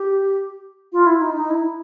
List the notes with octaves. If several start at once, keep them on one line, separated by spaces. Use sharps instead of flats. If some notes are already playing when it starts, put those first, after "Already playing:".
Already playing: G4
F4
E4
D#4
D#4
E4